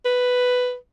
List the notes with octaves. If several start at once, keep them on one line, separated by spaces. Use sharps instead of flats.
B4